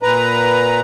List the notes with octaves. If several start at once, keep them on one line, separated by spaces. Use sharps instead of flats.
A#2 B4 A#5